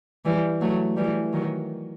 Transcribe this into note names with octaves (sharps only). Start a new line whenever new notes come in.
E3 G3
F#3 A3
E3 G3
D#3 F#3